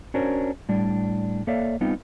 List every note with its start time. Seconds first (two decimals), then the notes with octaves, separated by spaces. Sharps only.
0.14 C#4 D4 F#4 A#4 C5 C#5
0.69 A2 G3 D4
1.47 A#3 A4 C#5 D5 E5 F5
1.81 G3 B3 C4 D#4 F4